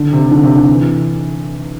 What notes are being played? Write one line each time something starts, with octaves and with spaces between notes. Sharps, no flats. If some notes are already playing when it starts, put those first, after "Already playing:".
Already playing: D3
C3
D3
C3
D3
E3